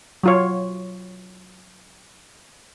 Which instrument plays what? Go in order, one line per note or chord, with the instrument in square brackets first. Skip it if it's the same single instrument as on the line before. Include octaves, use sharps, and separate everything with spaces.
[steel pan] F#3 F4 C#5